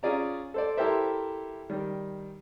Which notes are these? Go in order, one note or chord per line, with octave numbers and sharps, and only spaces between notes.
C#4 F4 G#4 D5 A#5
A4 C5 D5
E4 G4 A4 A#4 C5 E5
D#3 G3